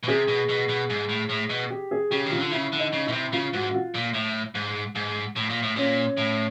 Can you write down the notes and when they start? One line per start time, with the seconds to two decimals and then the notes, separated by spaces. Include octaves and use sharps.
0.03 B2
0.08 C3 G#4
0.28 B2
0.49 B2
0.69 B2
0.90 G#2
1.09 A2
1.29 A2
1.49 B2
1.70 G4
1.91 G#4
2.11 C#3 G4
2.26 D#3
2.31 F4
2.39 D3
2.51 C#3 E4
2.72 D3
2.79 D#4
2.93 C#3
3.06 B2 E4
3.12 C3
3.32 C#3 F4
3.53 G#2 F#4
3.70 F#4
3.74 F4
3.94 A#2
4.14 A2
4.55 G#2
4.95 G#2
5.36 A2
5.49 A#2
5.62 A2
5.76 A#2 C#4
6.17 A2